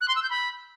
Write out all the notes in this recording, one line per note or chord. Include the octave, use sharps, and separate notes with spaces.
F#6
C6
E6
G6
B5